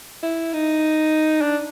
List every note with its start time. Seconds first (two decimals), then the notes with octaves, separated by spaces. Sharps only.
0.23 E4
0.53 D#4
1.41 D4